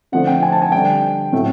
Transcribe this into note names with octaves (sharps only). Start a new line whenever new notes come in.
D3 F3 A3 F#5
G5
G#5
A5
G#5
D3 G3 G5
A2 F#3 A3